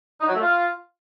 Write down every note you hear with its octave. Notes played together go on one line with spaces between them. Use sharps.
D#4
F#3
A3
F4